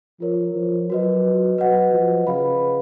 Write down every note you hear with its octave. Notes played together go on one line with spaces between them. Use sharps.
F3 F4 A#4 C#5
F3
F#3 F#4 B4 D#5
F#3 B4 D#5 F#5
F3
C#3 B4 F5 B5